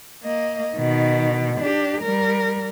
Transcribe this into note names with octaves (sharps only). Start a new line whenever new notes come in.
A#3 D#5
B2 D#3
D4 G4
G3 A#4